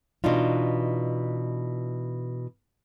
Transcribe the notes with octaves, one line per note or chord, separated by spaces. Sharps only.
B2 E3 D4 D#4 F4